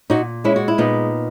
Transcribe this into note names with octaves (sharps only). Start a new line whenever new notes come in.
A#2 D#4 F#4
G#3 C#4 E4
F#4
E4
A#2 B3 D#4